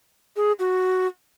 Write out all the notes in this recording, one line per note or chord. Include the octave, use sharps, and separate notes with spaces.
G#4
F#4